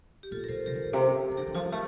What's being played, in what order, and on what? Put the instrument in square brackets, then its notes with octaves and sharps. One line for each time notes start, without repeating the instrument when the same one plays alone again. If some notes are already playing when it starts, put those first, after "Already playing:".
[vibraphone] G4
[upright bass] A#2 [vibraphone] F4 A4
[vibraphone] A#4
[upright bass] A#2 [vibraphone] A4 C5
[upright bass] C3 [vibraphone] G4 A#4
[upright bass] D3
A2
C3
[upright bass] E3 [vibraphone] A4
[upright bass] D3 [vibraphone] G4 A#4
[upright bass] E3
[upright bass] F3 [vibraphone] F4
[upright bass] G3
[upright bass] A3 [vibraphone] G4